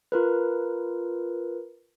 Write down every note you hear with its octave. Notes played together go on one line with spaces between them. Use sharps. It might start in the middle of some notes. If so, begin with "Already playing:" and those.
F4 A#4 B4